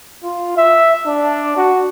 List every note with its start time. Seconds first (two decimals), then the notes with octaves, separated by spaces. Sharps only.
0.23 F4
0.57 E5
1.05 D4
1.57 F#4